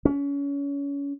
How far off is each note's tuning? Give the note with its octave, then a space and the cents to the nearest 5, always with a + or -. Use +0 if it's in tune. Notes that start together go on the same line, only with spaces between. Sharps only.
C#4 +30